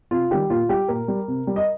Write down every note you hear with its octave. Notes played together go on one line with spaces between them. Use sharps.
C3 F4
D#3 G3 G4
A#2 F4
G3 G4
A#2 A#4
G3
C3
G3
D#5